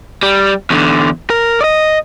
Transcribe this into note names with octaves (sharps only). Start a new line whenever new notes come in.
G3
E2 D3
A#4
D5 D#5